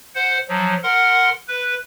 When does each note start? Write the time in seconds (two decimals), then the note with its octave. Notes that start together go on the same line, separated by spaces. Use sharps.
0.15 C5 F#5
0.48 F3 F#3
0.83 A#4 F#5 C6
1.48 B4